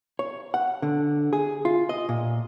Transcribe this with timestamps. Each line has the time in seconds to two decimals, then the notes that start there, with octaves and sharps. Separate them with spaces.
0.19 C#5
0.54 F#5
0.82 D3
1.33 G#4
1.65 F4
1.89 D#5
2.09 A#2